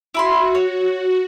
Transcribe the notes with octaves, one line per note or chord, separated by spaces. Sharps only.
E4 F#4 B5 C6
C#5